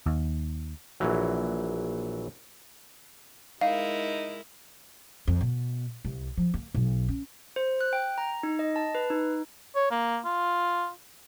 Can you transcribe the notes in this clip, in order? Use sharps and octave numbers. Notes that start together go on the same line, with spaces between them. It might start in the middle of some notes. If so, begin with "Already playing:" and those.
D#2
A#1 E3 F#3
G#3 D#4 E4 A#4 F5
F2
B2
C2
F3
A#3
B1
C#4
C5
F#6
G5
A#5
D#4
D#5
A5
B4
D#4
C#5
A#3
F4